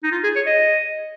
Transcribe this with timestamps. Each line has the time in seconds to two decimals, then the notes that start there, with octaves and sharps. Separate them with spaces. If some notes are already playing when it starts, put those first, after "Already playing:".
0.04 D#4
0.12 F4
0.23 G#4
0.36 C#5
0.46 D#5